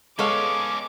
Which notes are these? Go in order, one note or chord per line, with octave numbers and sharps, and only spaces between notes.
G#3 B3 C#4 D#4 A4 C#5 F5 D6